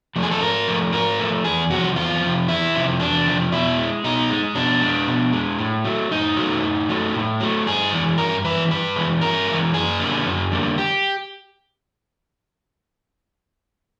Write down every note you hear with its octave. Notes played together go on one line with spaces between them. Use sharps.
F3 A3
G#4
A4
G#2 A#4
F3 A3
G#2 A#4
F3 A3
E2 G#4
C3 F3 F#4
E2 F4
C3 F3
E2 E4
C3 F3
E2 D4
C3 F3
B2 E4
G#3
B2 D#4
G#3
B2 D4
G#3
B2
G#3
A2
F#3 A3
A2 D#4
F#3 A3
A2
F#3 A3
A2
F#3 A3
G2 G#4
E3 G#3
G2 A#4
E3 G#3 B4
G2 B4
E3 G#3
G2 A#4
E3 G#3
F#2 G#4
D3 G3 A#3
F#2
D3 G3 A#3
G4